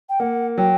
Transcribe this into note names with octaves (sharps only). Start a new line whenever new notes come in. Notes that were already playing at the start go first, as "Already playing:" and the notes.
G5
A#3 F#5
F#3 G5